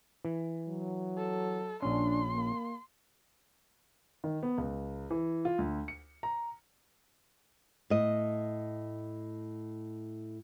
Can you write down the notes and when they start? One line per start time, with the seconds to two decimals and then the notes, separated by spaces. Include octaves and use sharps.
0.25 E3
0.68 F#3
1.18 A4
1.82 A#1 C#4 D4 C6
2.34 A#3
4.24 D#3
4.43 B3
4.58 C#2
5.11 E3
5.45 F4
5.58 D2
5.88 C#7
6.23 A#5
7.90 A2 D#5